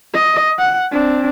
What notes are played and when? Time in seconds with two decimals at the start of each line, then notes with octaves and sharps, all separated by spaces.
0.14 D#5
0.59 F#5
0.91 C4 D4